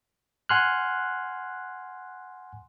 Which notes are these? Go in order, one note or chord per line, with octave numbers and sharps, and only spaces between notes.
F#5 G#5 C6 F6 F#6